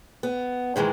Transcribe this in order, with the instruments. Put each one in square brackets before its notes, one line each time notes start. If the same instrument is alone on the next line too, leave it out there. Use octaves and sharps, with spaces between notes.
[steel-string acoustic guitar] B3
G#2 D#3 E3 G#3